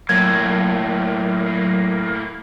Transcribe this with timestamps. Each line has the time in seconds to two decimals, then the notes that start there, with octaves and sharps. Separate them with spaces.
0.09 A2 F#3 A#3 G#6